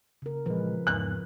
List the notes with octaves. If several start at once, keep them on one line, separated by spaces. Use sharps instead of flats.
C#3 A#4
A#2 E3 F3 G#3 B4
E2 G#2 F#6